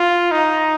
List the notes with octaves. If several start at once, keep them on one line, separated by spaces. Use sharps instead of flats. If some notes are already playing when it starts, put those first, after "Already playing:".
Already playing: F4
D#4